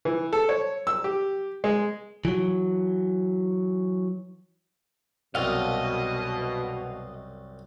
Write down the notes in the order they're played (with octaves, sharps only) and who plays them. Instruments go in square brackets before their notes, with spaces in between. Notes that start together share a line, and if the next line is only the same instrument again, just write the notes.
[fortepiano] E3
A4
C#5
E6
G4
G#3
[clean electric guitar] E3 F#3
[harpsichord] C2 F#2 [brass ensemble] B2 [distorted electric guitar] D#5 [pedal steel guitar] F5